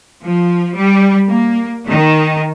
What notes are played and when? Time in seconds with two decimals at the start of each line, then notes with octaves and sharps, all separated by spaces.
0.23 F3
0.76 G3
1.29 A#3
1.88 D#3